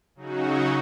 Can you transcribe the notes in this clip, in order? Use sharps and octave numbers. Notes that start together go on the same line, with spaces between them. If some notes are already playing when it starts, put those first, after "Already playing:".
C#3 F#3 D#4 F#4